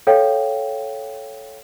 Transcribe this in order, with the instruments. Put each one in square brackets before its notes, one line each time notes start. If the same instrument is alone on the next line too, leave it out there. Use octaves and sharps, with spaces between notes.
[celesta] A4 C#5 F5 G5